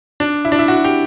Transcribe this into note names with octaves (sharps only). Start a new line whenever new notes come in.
D4
E4
D4
E4
F#4
G4